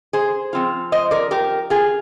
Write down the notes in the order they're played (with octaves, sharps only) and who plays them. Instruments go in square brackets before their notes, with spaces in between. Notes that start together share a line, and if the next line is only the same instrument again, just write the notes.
[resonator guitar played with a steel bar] G#4 C5
F3 C4 F4
C5 D#5
A#4 D5
G4 A#4
F4 G#4